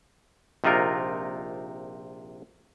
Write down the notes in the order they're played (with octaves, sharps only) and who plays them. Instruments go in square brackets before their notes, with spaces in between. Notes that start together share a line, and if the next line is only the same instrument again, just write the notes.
[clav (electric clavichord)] A#1 C3 D#4 F4 A#4